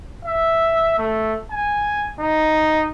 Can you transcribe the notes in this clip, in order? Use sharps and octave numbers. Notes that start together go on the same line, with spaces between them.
E5
A3
G#5
D#4